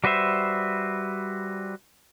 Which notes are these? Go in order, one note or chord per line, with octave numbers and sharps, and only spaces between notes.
G3 F#4 B4 C5 E5